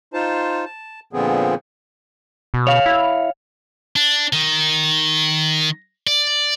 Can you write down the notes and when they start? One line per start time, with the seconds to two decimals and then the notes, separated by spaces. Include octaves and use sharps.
0.14 D#4 F4 C5 A5
0.65 A5
1.13 A#2 D3 F3 B3 C4 G#4
2.54 B2
2.67 C#5 F5
2.86 E4
3.96 D4
4.33 D#3
6.07 D5